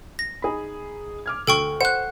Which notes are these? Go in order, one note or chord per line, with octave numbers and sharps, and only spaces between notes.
A#6
D#4 G#4 B5
D6 F6 G#6
D2 A4 G5 C#6
C5 F#5 F#6